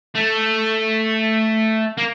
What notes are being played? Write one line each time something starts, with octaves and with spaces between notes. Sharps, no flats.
A3
A#3